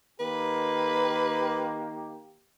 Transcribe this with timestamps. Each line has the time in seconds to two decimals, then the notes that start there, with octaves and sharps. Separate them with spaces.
0.20 D#3 A#3 G4 B4